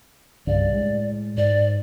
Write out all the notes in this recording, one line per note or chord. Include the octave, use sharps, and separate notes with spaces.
C2 G2 C#3 D5
A2 G#3
G#2 D5